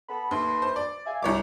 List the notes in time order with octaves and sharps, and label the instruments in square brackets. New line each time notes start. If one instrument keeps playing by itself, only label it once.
[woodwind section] B3 A4 B5
[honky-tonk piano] D#2 [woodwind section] A3 B4 C6
[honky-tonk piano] C5
D5
[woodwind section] E5 F5 G#5
[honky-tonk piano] C2 C#5 D6 [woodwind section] F#2